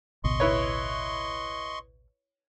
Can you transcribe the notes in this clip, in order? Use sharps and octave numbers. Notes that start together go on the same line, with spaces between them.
A1 D2 B2 D#5 C6 C#6
E4 B4 C#5